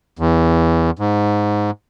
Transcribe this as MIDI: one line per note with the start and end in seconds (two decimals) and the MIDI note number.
0.19 0.91 40
0.99 1.71 44